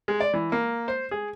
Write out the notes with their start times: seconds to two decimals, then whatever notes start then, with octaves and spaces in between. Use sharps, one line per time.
0.08 G#3
0.20 D5
0.34 E3
0.52 A#3
0.88 C5
1.11 G#4